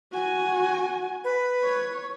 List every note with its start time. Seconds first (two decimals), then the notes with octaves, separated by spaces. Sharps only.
0.12 F#4 G#5
1.24 B4
1.64 C#5